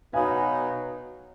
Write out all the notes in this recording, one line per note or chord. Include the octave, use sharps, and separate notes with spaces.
B2 F#3 B3 D#4 F5 G#5